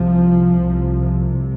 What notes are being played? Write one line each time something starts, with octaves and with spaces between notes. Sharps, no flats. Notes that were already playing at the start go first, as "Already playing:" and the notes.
Already playing: C2 C3 F3
C2 C3